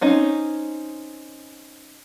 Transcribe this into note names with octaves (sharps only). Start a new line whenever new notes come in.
C4 C#4 D#4